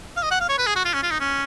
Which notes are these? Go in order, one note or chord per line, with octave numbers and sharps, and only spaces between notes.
F5
D#5
F#5
F5
C#5
B4
G#4
F#4
F4
C#4
F4
D#4
C#4